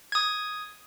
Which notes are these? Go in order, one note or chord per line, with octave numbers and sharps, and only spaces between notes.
D#6 G#6